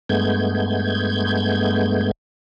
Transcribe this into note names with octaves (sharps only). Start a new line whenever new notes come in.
G2 G#3 A3 B3 G6 G#6